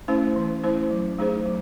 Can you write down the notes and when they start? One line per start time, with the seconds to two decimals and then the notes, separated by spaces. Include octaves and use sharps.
0.08 A3 C#4 E4 C5
0.36 E3
0.63 A3 C#4 E4 C5
0.91 F#3
1.18 A3 D#4 G#4 C5
1.46 F#3